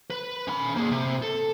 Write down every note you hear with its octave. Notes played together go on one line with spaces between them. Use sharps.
B4
C#4 B5
A#3 G#4
C3
A4